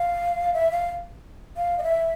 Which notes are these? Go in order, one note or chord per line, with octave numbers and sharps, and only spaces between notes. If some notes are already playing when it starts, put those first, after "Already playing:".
Already playing: F5
E5
F5
F5
D#5
E5